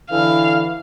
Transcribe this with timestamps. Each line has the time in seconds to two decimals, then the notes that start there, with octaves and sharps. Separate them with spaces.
0.10 D3 E3 F5